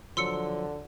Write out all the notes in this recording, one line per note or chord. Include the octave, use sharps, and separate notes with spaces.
D3 F3 F#3 C6 E6 C#7